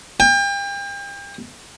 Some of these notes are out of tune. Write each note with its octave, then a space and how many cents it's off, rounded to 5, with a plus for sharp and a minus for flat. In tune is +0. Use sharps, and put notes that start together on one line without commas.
G5 +35